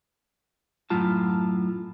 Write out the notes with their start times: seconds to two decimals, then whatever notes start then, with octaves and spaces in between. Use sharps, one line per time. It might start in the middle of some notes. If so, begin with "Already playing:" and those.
0.90 F#2 A2 F#3 F4 A5